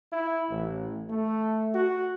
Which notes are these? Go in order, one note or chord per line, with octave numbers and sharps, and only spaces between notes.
E4
A1
A3
F#4